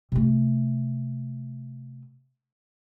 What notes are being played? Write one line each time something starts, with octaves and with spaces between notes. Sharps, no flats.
C3 A3